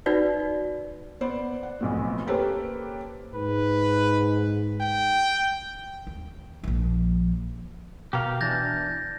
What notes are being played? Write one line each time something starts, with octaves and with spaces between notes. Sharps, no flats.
D#4 F#4 B4 D5
B3 C5 D5
F#5
B1 F2 A2
A#3 C#4 G4 A4 B4 C5
G#2 B4
G5
D#2
A#1 F3
B2 G4 A#4 F5
E3 D4 G6 A6 A#6